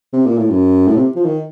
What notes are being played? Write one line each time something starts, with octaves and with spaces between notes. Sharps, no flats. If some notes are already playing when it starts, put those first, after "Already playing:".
C3
A#2
A2
F#2
A2
C3
F3
D#3